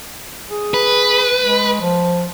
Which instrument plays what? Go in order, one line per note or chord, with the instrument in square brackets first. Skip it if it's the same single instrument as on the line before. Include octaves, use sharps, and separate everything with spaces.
[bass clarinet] G#4
[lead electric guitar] B4
[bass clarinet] G#3
F3